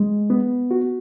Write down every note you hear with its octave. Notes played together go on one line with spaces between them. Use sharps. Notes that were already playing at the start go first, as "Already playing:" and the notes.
Already playing: G#3
B3
F#4